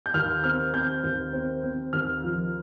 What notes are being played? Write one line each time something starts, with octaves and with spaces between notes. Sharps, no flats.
G6
D#2 F6
C4 F6
C4 G6
D#2
C4
C4
D#2 F6
F3